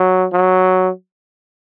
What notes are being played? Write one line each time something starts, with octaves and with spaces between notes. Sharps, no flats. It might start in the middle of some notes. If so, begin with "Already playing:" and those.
Already playing: F#3
F#3